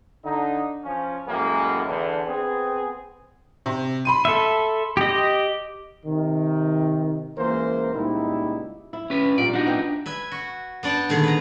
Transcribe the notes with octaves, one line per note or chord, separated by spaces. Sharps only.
D3 D#4
F3 C#4
F#2 A2 G#3 A#3
E2 D3
B3 C4 G#4
C3
B5 C6 D#7
A4 E5
G4 D#5
C3 D#3
C#2 E3 A#3 A#4 C5
C#2 A#2 G3 D#4 E4
E4
C#4 B4
D4
A#2 G3 A#3 D5
D4 D#4 F#4 F#5
B3 E5 G5
B4 E5 G#5
F#4
B3 D4 D5 G5 A5
A#2 D3 D#3 B3 G#4
B4 A#5